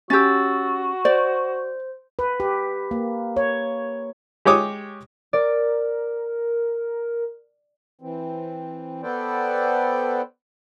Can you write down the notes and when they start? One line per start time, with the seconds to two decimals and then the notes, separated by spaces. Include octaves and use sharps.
0.10 C#4 F#4 G4 E6 A6
1.05 C5 D5
2.19 B4
2.40 G4
2.91 A#3
3.37 C#5
4.45 G#3 G4 C#5 D6 D#6
5.33 A#4 D5
8.01 E3 C4
9.03 B3 A4 B4 C5 D5 G5